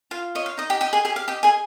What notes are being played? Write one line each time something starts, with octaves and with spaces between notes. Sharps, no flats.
F4 F5
C#5 D#5
F5
D#4 D#5
G4 G5
G4 D#5 G5
G#4 G#5
G4 G#4 G#5
F5
G4 D#5 G5
G#4 G#5